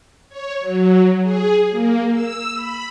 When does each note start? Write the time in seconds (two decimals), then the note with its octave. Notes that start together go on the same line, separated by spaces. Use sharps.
0.29 C#5
0.61 F#3
1.22 G#4
1.71 A#3
2.11 E6
2.55 B5